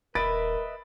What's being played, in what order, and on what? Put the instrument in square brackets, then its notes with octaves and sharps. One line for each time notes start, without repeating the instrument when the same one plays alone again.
[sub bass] D#1 [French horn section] A#4 [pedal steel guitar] B4 D#5 E5 [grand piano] B5 A6 D7